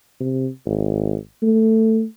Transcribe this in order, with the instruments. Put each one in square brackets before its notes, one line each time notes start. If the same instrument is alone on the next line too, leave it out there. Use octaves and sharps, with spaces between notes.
[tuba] C3
G#1
A3